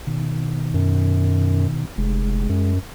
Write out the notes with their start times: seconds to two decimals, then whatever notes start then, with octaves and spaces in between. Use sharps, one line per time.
0.07 B2 D#3
0.74 F#2
1.98 F1 G#3
2.49 F#2